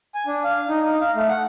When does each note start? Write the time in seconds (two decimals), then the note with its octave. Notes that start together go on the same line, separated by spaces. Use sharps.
0.15 G#5
0.27 D4
0.44 F5
0.69 D#4
0.83 D#4
1.01 F5
1.15 A3
1.29 F#5